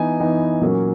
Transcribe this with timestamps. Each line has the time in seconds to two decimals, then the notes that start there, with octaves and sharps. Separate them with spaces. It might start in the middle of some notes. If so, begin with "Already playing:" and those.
Already playing: E3 B3 D#4 G#5
0.20 E3 B3 D#4
0.61 A#2 F#3 A#3 C#4